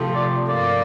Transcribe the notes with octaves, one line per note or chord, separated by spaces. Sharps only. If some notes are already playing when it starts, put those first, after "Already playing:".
Already playing: C3 F3 A3
D5
G2 F3 A#3 F4 D5